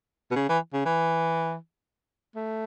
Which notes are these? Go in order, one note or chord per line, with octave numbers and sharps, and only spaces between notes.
B2
C#3
E3
C#3
E3
A3